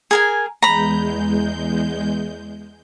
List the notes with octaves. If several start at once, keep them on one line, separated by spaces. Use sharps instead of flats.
G#4 A#4 G#5
E2 G#3 A#5 B5 G6